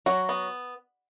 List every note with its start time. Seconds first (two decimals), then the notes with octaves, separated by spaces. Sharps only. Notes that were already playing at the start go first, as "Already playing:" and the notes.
0.06 F#3 F#4
0.29 B3